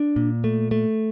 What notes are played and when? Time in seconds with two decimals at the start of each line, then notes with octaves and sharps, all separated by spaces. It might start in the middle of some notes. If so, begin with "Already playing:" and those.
Already playing: D4
0.16 A#2
0.44 A3
0.71 A3